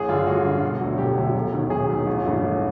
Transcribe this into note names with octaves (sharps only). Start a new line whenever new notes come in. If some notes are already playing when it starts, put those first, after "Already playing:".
Already playing: A1 G#4
G2 D3 F4
A1 F#4
G2 D3
E1
D2 D3 F#3
E1 G4
D2 D3 F#3
E1
D#2 D#3 F#3
E1 G#4
D#2 D#3 F#3
A1
G2 E3 A3
A1